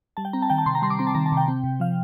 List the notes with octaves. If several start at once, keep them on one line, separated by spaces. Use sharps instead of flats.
G3 A5
G5
C4 A#5
A5
D#3 G5
A5
C3 C6
A#5
G3 C6
D6
C4 C6
A5
D#3 A#5
A5
C3
G5
C4
C3
F3 F5